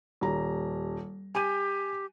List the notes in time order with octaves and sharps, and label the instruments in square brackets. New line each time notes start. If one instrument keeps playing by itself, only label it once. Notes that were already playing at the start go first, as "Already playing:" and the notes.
[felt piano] D#1 G3 A#5
[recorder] G4 [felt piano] G#5 D#7